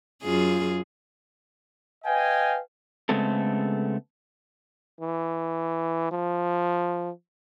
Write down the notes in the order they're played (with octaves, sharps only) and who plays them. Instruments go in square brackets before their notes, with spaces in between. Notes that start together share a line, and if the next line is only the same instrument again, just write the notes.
[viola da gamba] F#2 F4 G#4
[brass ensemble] B4 D#5 F5 G5 G#5
[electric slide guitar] C#3 G#3 A3 B3 C4 A4
[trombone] E3
F3